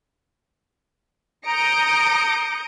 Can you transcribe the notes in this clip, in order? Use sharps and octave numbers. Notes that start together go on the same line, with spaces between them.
A#5 D#6 G6 A#6 C#7 D7